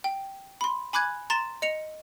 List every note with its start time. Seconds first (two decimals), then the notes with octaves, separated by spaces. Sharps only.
0.04 G5
0.61 B5 C6
0.93 G#5 B5 D6 F#6 G#6
1.30 A#5 C6 A6 E7
1.62 D#5 C#7 F7